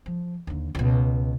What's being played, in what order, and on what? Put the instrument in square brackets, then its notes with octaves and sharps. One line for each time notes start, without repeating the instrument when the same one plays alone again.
[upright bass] F3
D#2 D3
C#2 B2